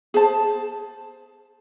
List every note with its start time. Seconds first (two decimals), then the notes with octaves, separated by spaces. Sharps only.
0.14 G#4 C5 A5